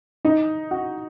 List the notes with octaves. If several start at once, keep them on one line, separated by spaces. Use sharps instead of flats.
D#4
F#4